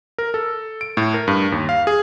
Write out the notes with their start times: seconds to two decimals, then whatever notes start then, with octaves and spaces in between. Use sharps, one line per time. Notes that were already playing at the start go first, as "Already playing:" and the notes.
0.18 A#4
0.34 A4
0.81 D7
0.97 A2
1.14 A#4
1.28 G2
1.52 D#2
1.69 F5
1.87 G#4